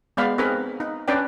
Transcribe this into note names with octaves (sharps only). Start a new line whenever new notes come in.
G#3 B3 D5 F5 B5
C4 D#4 G#4 A#4 B4 B5
D#4
C#4 D4 B4 D5 G5